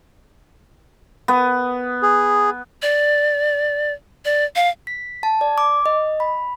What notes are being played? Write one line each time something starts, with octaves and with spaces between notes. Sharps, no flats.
B3
G#4
D5
D5
F5
B6
A5
D5
D6
D#5
B5